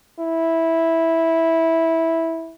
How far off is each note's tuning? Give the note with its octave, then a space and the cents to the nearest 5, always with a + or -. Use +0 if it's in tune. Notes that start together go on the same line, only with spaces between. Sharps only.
E4 -10